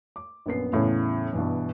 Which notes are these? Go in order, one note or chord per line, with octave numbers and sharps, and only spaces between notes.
D6
A#1 F#2 B3 C7
E2 A2 C#3
G2 B2 E3